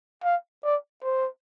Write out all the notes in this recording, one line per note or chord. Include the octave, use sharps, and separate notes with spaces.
F5
D5
C5